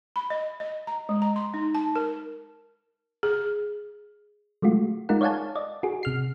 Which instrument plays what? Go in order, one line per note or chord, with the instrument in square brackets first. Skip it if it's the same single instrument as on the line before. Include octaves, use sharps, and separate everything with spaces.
[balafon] B5
D#5
D#5
A#5
G#3
A#5
C6
D#4
A5
A#4
G#4
[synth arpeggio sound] F#3 G#3 A3 F4 F#4
G#3 D#4 F4 A#4 F#5
C#5 D5 F5 F#5 G#5 A5
D5 D#5
F#4 G#4
C3 F6 C7